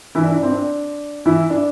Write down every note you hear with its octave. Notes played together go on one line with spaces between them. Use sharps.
E3 E4
D4
D4
C4
D4
E3 E4
D4